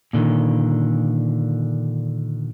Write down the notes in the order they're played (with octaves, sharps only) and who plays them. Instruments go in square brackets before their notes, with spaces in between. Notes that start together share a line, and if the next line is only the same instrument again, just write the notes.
[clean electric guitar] A#2 D3 D#3